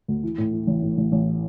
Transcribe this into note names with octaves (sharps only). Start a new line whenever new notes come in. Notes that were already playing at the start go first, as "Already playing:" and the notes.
D2
E3
A2
E3
A1
A2
A1
A1